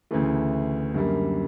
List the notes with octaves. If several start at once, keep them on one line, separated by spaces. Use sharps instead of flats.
D2 C#3 E3 A3
F#2 D3 G3 A#3